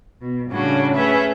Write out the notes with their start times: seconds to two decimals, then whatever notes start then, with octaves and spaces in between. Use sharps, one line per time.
0.21 B2
0.52 A2 C#3 G3 C#4 D4 F#4
0.95 A3 C#4 G#4 B4 E5